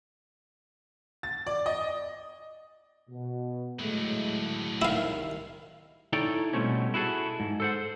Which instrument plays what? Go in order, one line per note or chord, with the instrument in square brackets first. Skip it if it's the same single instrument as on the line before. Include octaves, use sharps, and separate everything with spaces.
[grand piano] A6
D5
D#5
[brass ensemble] B2
[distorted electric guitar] A2 F#3 [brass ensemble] G#3 A3
[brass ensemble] C2 D#3 [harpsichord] E4 F5
[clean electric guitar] D#4 E4 A4 C#5 D5 G5
B2 D3 G3 A3 C4 C#4
E4 F#4 G#4 A4
G#2
A4 C5 F#5